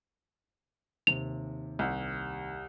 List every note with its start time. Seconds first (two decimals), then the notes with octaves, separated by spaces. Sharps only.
1.07 D#2 C3 F7
1.79 C2